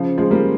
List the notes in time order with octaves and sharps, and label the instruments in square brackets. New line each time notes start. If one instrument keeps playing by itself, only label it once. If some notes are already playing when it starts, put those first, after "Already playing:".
Already playing: [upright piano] C#3 F3
F3 G#3
G3 A#3